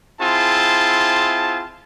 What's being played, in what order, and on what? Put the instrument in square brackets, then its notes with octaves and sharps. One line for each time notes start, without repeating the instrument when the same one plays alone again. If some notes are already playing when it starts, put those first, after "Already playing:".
[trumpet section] C4 E4 F4 G#4 A5